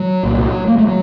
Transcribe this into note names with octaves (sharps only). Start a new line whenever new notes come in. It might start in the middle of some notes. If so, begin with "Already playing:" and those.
Already playing: F#3
C2 A#2
A#3
A3
F#3